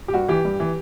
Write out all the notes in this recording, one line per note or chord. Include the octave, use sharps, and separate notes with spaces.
G4
G2 F#4
E3 G4
G2
E3